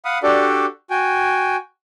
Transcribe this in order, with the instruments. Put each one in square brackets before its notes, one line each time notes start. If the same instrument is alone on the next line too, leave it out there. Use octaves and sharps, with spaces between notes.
[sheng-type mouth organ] F5 F#5 B5 D#6
D4 F#4 G4 A4 D5
F#4 G5 G#5